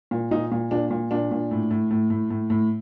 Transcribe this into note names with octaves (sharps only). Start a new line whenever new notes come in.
A#2
A#2 D#4
A#2
A#2 D4
A#2
A#2 D4
A#2
A2
A2
A2
A2
A2
A2